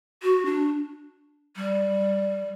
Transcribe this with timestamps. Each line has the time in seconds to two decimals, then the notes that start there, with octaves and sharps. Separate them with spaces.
0.23 F#4
0.45 D4
1.56 G3